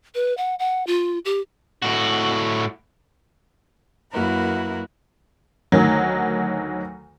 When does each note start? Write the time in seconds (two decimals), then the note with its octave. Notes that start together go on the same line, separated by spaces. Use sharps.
0.15 B4
0.37 F#5
0.59 F#5
0.87 F4
1.25 G4
1.82 A2 F#4
4.12 F#2 A#3 E4 F#4 A#4 B4
5.72 D2 D#3 F#3